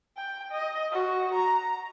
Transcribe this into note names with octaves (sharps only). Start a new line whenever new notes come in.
G5
D#5
F#4
A#5